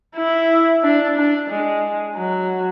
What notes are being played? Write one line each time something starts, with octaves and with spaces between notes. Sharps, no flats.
E4
D4
D4
G#3
F#3